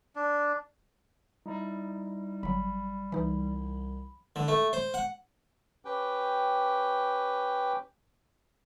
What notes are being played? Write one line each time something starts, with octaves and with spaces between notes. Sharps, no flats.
D4
G3 D#4 E4 A#5
G1 F#3 B5
C2 E3 D#4
D3
A3
C5
F#5
C#4 G4 B4 G5